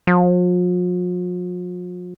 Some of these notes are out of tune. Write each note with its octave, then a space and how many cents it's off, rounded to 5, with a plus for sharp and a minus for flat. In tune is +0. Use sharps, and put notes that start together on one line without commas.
F3 +45